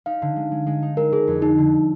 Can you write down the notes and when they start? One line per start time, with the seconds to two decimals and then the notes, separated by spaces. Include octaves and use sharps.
0.06 D#4 F5
0.22 D3
0.36 G#3
0.51 G#3
0.67 G#3
0.82 D#4
0.97 G#3 A#4
1.12 D3 G#4
1.27 F2
1.42 G#3 D#4
1.58 D3